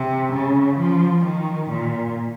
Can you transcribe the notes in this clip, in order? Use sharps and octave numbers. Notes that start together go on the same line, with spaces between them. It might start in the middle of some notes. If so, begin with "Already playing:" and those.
Already playing: C3
C#3
F3
D#3
A#2